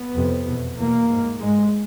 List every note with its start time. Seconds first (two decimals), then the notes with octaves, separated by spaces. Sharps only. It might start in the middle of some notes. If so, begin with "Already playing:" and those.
Already playing: B3
0.15 F2 C3
0.47 E2 B2
0.78 E2 B2 A#3
1.09 G#2
1.40 G#2 G#3